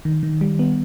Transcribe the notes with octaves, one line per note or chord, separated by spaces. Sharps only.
D#3
D#3
G3
B3